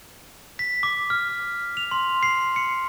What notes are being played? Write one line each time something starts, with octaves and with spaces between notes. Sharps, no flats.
B6
D6
F6
F7
C6
C7
C#7